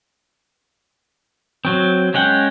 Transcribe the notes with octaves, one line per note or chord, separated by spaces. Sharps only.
F#3 C4
G#3 C#4 F#5 G5